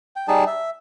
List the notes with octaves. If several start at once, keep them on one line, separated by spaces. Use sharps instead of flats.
G5
G3 D#4 G#4 A5
E5